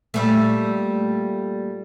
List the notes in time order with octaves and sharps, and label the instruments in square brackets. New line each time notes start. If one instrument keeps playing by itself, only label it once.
[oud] A#2 G3 A3